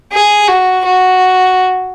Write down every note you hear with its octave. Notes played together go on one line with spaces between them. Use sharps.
G#4
F#4
F#4